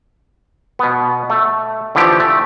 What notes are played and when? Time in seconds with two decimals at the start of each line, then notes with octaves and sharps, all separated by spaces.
0.79 B2 B3
1.30 A3
1.95 D3 E3 F3 A3 G4
2.20 A3